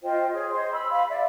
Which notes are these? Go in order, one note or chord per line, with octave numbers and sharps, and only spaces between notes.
F4 C5 D#5 G5
G#4 C#5
C5 D#5 C6
B5 E6
F5 B5
D5 E5